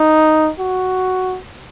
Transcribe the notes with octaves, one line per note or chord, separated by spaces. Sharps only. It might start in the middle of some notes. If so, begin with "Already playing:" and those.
Already playing: D#4
F#4